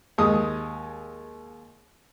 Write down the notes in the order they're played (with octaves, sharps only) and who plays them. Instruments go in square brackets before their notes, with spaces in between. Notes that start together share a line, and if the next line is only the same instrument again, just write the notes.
[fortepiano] D#2 G#3 D#6